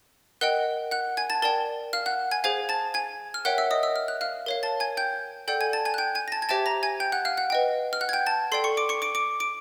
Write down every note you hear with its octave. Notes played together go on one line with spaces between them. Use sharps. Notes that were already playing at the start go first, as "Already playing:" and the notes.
A#4 D#5 F#5 G5 F#6
F#5 F#6
G#5 G#6
A5 A6
A#4 D5 G5 A5 A6
F5 F6
F#5 F#6
G#5 G#6
G#4 C5 F5 G#5 G#6
A5 A6
G#5 G#6
F6
A#4 C#5 E5 F#5 G5 F#6
E5 E6
D#5 D#6
E5 E6
F6
F#6
F5 F6
A#4 C#5 F5
A5 A6
G#5 G#6
G5 G6
A4 D5 F#5 G5 G6
G#5 G#6
A5 A6
G#5 G#6
F#6
G5 G6
G#5 G#6
A#6
A5 A6
G#6
G4 C5 E5 G5 A5 A6
A#5 A#6
G#5 G#6
G5 G6
F#5 F#6
F5 F6
F#5 F#6
B4 D#5 G5
F6
F#5 F#6
G#6
G5 G6
A5 A6
A4 D5 G5 C6 C7
C#6 C#7
D6 D7
C#6 C#7
D6 D7
D6 D7
D6 D7